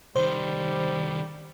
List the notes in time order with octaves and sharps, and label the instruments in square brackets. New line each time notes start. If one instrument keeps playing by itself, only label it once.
[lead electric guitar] C2 D#3 [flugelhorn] G3 [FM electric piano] C5